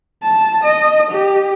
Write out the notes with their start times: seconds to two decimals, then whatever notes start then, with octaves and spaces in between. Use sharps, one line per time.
0.23 A5
0.64 D#5
1.11 G4